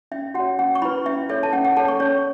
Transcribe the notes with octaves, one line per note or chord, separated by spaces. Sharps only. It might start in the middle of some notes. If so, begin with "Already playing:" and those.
C#4 E5
F#4 C#5 F#5
C#4 F#5
C#6
E4 B4 B5
C#4 E5
A4 C#5 E5
A5
C#4 F#5
F#5
A4 C#5 A5
C#6
C#4 C#5